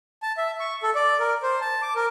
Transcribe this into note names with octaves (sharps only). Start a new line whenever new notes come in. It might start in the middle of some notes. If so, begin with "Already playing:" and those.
A5
E5
C#6
A4
D5
A#4
C5
A5
D6
A#4